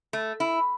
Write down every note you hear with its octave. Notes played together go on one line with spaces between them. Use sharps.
A3
E4